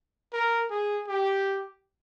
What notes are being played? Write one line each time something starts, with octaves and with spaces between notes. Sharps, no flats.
A#4
G#4
G4